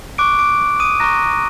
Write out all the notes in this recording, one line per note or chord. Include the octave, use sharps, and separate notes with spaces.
C#6 D6 F#6 D7
D6 D7
D#6 D#7
A#5 C#6 F#6 A#6